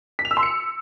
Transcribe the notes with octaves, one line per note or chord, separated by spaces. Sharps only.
B6
F7
E6
C6
C#7